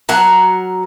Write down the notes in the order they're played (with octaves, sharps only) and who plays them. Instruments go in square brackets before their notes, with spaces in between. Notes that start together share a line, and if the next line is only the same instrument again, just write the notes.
[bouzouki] F#3 A#4 F#5 A#5